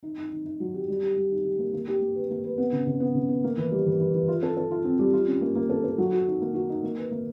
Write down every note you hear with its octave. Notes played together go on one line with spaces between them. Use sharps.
D#4
D#4
D#4
D#4
F#3
G4
G3
G4
G3
D#4
G4
A#3
A#3
G4
A#3
B4
A#3
B4
B3
C#3
C#3
B3
C#3
B3
A#3
E3
G3
E3
E3
E3
F4
A4
A4
F4
C4
G3
F4
C#4
A#3
A#3
A4
A4
F#3
F#4
D#4
A#3
F#4
D#4
A#3
B4
A#3